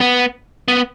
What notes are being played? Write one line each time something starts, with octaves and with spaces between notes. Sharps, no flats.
B3
B3